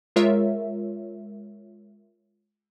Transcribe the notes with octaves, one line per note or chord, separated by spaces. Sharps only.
G#3 F4 A#4 C#5 E5